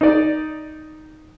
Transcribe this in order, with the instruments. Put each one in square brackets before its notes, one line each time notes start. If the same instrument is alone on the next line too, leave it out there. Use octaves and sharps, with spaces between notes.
[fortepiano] D#4 D5